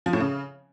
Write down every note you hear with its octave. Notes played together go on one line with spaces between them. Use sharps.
F3
A2
C#3